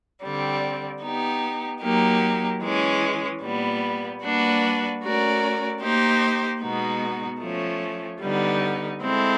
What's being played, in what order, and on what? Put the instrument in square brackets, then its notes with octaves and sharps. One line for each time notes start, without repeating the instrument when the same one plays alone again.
[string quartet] D3 G3 C4
B3 D#4 G4
F#3 A#3 D#4 G4
E3 G#3 C#4
A#2 G3 B3
G3 A#3 D4 F#4 B4
A3 C#4 F#4 A#4 D5
A#3 D#4 G4 C5
B2 G#3 B3 D#4 F#4
F3 A3 C#4
D3 G3 B3 D#4
G#3 C4 E4 A4